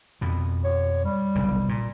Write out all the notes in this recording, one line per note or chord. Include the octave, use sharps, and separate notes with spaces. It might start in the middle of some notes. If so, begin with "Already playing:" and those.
F2 B2
C#5
G3
F1 B1 C#3
A#2